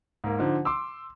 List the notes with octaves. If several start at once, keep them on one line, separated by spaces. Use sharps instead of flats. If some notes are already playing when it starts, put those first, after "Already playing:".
G#2 A#3
D3 F3 D#4 C5
C6 D6 E6